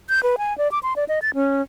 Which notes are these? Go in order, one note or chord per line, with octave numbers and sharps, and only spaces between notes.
G6
B4
G#5
D5
D6
C6
D5
D#5
A6
C#4